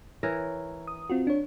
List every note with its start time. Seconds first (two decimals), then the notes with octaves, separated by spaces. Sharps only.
0.23 E3 A#4 C#5
0.88 D#6
1.10 C4 F4 F#4
1.27 D4 C#5